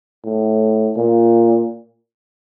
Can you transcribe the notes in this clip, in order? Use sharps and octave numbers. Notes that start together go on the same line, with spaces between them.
A2
A#2